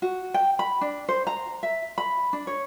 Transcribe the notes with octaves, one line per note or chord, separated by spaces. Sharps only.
F#4
G5
B5
D4
C5
A#5
E5
B5
D4
C#5